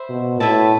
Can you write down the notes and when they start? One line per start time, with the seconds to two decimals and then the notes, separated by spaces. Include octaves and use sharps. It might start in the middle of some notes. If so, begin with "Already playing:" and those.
Already playing: C5 E5 B5
0.10 B2
0.40 A2 E4 B4 E5 A5